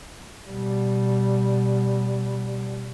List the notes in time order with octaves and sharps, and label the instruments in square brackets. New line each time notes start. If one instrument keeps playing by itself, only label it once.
[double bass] B2 G3